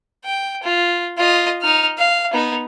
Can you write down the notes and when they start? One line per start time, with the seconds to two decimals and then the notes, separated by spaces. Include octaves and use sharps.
0.25 G5
0.63 F4
1.17 F4 D#5
1.62 D#4 F6
1.98 F5
2.33 B3 D#4